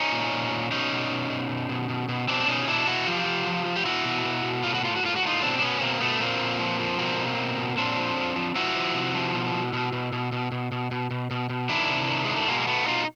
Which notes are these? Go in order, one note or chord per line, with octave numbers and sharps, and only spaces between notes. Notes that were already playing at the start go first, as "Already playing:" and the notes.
Already playing: C#4 D#4
A#2
A#2
A#2
B2 C#4 D#4
B2
B2
B2
B2
B2
B2
B2
B2 C4 D4
B2 C#4 D#4
B2 D4 E4
B2 E4 F#4
F3 F4 G4
F3
F3
F3
G4
B2 E4 F#4
B2
B2
B2
A2 F4
F#4
A2 F4
F#4
A2 F4
F#4
A2 D#4 F4
B2 C4 D4
D4
B2 B3 C#4
B2 A#3 C4
B2 A3 B3
A#2 A#3 C4
A#2
F3
F3
B2 A#3 C4
B2
B2
B2
A#2 C4 D4
F3
F3
F3
F3 E4 F#4
F3
C3
F3
B2
B2
B2
B2
B2
B2
B2
B2
B2
B2
B2
B2
D#3 D4 E4
C3
D#3
D#3 G#3
A3
B2 G#3 A#3
A#3
B2 A3 B3
B2 D#4 F4